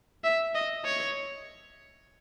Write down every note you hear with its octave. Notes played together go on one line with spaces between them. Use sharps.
E5
D#5
C#5